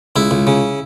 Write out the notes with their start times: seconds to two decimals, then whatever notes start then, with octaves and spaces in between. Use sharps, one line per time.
0.16 C#2 E4
0.31 C#2
0.47 C#3